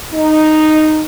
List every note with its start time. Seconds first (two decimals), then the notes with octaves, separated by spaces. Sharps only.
0.14 D#4